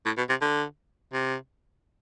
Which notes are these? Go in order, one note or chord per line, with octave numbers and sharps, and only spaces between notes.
A2
B2
C3
D3
C3